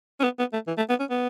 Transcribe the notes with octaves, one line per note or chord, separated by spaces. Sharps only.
C#4
B3
B3
A3
E3
A3
B3
C#4
B3